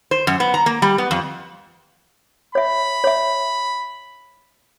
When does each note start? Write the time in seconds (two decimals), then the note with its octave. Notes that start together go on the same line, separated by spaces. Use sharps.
0.11 C5
0.27 F#2
0.40 B3
0.54 A#5
0.66 A#3
0.82 G3
0.98 B3
1.11 F2
2.55 C#5 E5 B5
3.04 C#5 E5